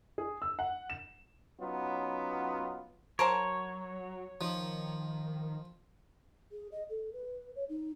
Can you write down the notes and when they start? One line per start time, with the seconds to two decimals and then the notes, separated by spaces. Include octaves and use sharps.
0.18 G#4
0.42 E6
0.59 F#5
0.90 E7
1.61 F#3 B3 C#4 D#4 F4
3.19 F#3 A#4 C5 C#5 A5
4.41 D#3 F3
6.52 G#4
6.72 D#5
6.89 A4
7.13 B4
7.56 C#5
7.69 D#4